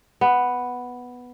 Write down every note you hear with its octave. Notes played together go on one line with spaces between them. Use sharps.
B3